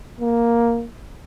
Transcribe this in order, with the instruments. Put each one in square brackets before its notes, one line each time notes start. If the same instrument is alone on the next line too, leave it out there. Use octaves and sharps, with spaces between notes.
[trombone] A#3